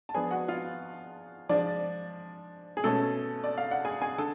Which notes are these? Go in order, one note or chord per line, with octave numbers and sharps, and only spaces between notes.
A5
F3 B3 D4 G#4 G#5
F#4 F#5
F4 F5
F3 G#3 D4 D5
G#4
B2 A3 C#4 A4
D5
F5
F#5
G#4 G#5
G#4 G#5
D3 A4 A5